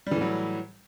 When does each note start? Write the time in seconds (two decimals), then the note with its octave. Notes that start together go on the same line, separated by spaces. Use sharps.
0.07 G3
0.11 E3
0.16 A2
0.21 F#3